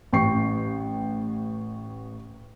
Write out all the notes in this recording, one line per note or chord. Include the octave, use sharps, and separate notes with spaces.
A1 G5 C#6 C7